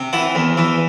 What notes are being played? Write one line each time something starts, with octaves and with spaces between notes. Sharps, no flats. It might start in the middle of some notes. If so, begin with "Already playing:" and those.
Already playing: C3
E3 F#5
E2
E3